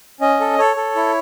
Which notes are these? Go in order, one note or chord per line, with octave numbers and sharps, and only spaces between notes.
C#4 D#5
A4
A4 C#5
A4
E4